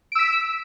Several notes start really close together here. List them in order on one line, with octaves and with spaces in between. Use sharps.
D7 E6 B6